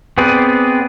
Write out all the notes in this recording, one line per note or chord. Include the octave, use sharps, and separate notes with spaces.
B3 C4 G#4 B4 D5